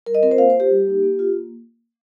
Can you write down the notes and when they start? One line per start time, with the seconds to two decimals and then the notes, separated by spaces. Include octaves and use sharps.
0.06 G3 A#4
0.15 D#5
0.23 C4 A#4
0.27 F4 C5
0.38 A#3 F5
0.50 C5
0.55 F4 G4
0.71 G3
0.87 A#3 D#4
1.03 A#3
1.19 F4
1.36 A#3